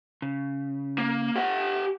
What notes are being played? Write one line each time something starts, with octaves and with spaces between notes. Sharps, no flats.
C#3
A#3
G4 F#5